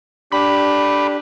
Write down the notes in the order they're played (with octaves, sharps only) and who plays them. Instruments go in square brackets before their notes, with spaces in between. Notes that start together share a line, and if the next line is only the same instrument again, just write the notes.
[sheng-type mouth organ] D4 G4 [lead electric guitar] A4 B5